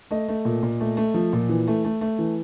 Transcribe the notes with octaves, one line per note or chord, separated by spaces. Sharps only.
A3 D#5
A3
A#2
A#2
A3
A3
F3
A#2
E3
A3
A3
A3
E3